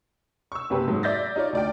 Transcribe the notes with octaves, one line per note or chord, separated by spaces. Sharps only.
C#6 E6
F#1 C3 G4 B4
G#2 F#3
D5 E5 G6 A6 A#6
D#4 F4 C#5 D5
D2 D5 G5